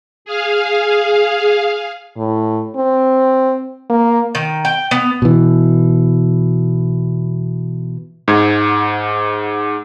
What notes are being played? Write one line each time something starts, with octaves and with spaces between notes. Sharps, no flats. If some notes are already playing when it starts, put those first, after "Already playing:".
G#4 F5
A2
C4
A#3
D#3
G5
B3
B2 E3
G#2 G#6